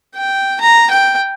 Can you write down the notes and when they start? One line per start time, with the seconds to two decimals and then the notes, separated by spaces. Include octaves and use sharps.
0.15 G5
0.60 A#5
0.91 G5